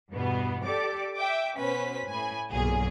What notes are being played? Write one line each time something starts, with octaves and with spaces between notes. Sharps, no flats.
E2 G2 B2 B3
G4 A4 D5 D6
E5 G5 D6
B2 C#4 B4 C5 B6
A2 G#5 B5
B1 G2 A#2 F#3 G#4